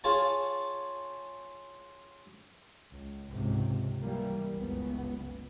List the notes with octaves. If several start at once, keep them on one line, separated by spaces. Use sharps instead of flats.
F4 G#4 C#5 A5
C#2
C#2 G#2 C3
E3 G3 A#3
F#1 C#2 B3